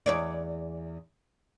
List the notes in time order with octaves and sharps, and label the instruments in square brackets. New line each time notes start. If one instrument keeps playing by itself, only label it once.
[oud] E2 C#5 D5